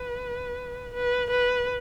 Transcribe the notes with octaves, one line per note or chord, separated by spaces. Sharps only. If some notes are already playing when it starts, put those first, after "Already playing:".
Already playing: B4
B4
B4